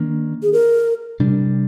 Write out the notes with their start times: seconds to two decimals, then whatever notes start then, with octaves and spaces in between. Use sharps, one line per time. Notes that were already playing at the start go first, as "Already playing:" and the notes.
Already playing: D#3 A#3 D4
0.43 G#4
0.53 A#4
1.20 C3 G3 D4